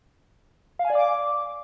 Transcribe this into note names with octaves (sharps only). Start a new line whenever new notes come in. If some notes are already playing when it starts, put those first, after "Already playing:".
F5
G#5
D5
D6